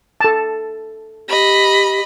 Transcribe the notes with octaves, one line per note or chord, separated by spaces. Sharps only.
A4 A5
G4 D#5 B5